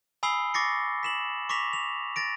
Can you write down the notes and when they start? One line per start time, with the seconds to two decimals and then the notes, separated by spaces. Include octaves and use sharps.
0.23 G#5 B5 D#6 E6 C7 G7
0.54 C#6 D6 A6 A#6 C7 C#7
1.03 B6 E7 F#7
1.49 C#6 D6 A#6 B6 F7
1.73 F7
2.16 A6 A#6 D7